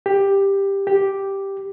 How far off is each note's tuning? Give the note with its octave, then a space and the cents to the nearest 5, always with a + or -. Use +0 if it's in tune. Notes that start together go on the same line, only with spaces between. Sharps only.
G4 +10
G4 +0